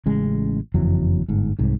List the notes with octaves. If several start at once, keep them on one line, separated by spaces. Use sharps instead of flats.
A1 C#3 G#3
F#1 F2 E3 F#3
G1 G#2
C2 G#2